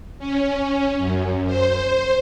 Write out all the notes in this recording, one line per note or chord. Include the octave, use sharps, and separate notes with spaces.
C#4
F#2
C5